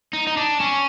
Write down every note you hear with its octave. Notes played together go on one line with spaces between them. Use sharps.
D#4
D#4
D4
C#4